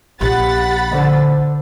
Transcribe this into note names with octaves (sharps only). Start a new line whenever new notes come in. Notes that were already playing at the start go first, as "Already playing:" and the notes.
A#1 G4 F#5 B5 A6
D3 C5